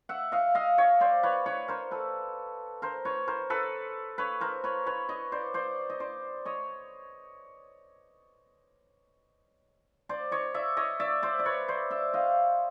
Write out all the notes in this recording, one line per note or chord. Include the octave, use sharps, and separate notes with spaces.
E5 F#5
D#5 F5
D#5 F5
C#5 D#5
C5 D5
B4 C#5
B4 C#5
A#4 C5
A4 B4
A#4 C5
B4 C#5
A#4 C5
A4 B4
B4 C#5
A#4 C5
B4 C#5
B4 C#5
C#5 D#5
C5 D5
C5 D5
D#5
C5 D5
C#5 D#5
C5 D5
C#5 D#5
D5 E5
C#5 D#5
D5 E5
C5 D5
D5
B4 C#5
C5 D5
D5 E5
D#5 F5